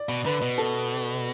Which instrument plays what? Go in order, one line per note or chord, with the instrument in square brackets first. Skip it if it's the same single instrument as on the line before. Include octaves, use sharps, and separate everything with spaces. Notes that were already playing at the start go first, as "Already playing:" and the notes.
Already playing: [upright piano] D5
[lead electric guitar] B2
[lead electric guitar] D3 [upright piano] B4
[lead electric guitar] B2
[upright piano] A4